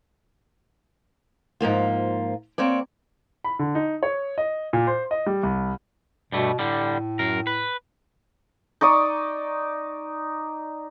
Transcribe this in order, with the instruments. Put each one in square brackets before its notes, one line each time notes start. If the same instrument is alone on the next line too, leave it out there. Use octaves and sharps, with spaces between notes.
[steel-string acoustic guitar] G#2 F3 A#3 F4
A#3 C4 C#5 D5
[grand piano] B5
D3
D#4
C#5
D#5
A#2
C5
D#5
G3
C2
[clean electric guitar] G2 G3 A3 [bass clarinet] B2
[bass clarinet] A2 [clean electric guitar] D3 G3
[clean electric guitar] F#2 A#4
B4
[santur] D#4 D5 C#6 D#6